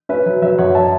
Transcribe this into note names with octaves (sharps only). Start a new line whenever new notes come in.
C#4 B4 E5
F#3
F#3 B4 E5
F#2 C#5 F#5
E5 A5